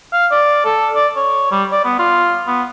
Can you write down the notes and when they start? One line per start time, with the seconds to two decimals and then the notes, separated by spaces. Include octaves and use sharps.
0.12 F5
0.31 D5
0.65 A4
0.94 D5
1.16 C#5
1.51 G3
1.72 D5
1.85 B3
1.99 F4
2.47 B3